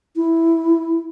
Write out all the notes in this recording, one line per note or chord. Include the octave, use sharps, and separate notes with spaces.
E4